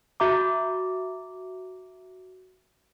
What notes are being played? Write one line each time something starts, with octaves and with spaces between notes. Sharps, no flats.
F#4 E5 A#5 D6